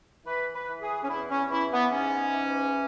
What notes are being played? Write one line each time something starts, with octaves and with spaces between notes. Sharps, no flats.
E3 B4
B4
E3
G#4
C#4
E2 E4
C#4
E3 E4
B3
G#2 C#4
E3